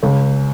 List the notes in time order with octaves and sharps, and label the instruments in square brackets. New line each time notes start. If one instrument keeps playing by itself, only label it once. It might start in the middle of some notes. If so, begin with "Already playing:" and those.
[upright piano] C#2